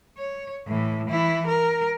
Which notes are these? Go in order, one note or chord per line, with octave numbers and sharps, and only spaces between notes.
C#5
A2 E3
E3 E4
A#4